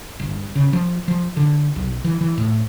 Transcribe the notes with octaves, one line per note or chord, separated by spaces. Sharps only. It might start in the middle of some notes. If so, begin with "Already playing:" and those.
G1
C#3
F3
F3
D3
B1
E3
E3
A2